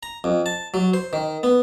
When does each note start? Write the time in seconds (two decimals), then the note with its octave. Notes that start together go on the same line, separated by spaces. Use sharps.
0.03 A#5
0.24 F2
0.46 A5
0.74 F#3
0.94 C5
1.13 D#3
1.43 B3